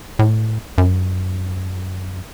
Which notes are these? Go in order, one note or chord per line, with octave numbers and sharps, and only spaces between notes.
A2
F#2